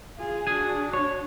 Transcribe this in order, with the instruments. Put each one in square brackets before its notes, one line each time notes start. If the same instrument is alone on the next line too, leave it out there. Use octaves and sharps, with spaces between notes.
[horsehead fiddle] F4 G#4
[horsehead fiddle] D4 F#4 [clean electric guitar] G#4 G#5
[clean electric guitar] C#5